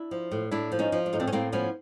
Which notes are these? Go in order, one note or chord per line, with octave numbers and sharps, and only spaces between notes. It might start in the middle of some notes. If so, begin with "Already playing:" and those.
Already playing: D4 E4
F3
A2
A2 D4 E4
F3
C#4 D#4
F3
D4
A2 D#4
C4 D4
C#4
A2 A#3 C4
F3 B3 C#4